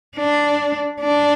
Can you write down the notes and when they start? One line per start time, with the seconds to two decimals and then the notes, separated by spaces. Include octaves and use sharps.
0.17 D4
1.01 D4